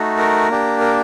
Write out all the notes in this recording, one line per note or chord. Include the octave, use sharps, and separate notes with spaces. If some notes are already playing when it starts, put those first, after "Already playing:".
Already playing: A3 D#4 F#4
A#4
A#3 D4 G4
A#4